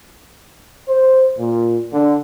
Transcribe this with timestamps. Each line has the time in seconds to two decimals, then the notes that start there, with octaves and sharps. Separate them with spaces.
0.88 C5
1.38 A#2
1.93 D3